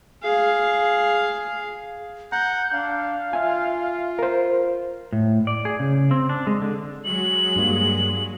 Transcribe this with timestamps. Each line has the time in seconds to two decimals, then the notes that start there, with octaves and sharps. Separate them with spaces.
0.24 G#4 F5
2.32 F#5 A#5 G6
2.73 D4 F5
3.33 F4 E5 G#5
4.19 A#4 C5
5.13 A2
5.47 D5
5.65 G#4
5.79 C#3
6.11 C4
6.29 D4
6.47 G#3
6.62 D3
7.05 F#3 G#3 F#7
7.56 G2 G3 A#3